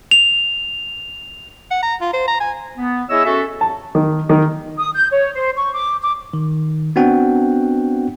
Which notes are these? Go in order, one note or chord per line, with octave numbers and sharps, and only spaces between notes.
F7
F#5
A#5
F4
C5
A#5
G#5
B3
E4 G#4 C#5 D#5 E6
C#4 F#4 A4 E5
A5
D#3
D#3
D#6
G6
C#5
C5
C#6
D6
D6
D#3
B3 C4 D4 F#4 F#5 G5